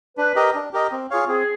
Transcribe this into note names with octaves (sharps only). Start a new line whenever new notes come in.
D4 B4
G4 A#4 D#5
D4
G4 A#4 D#5
C4
F4 G#4 C#5 F5
C4 G#4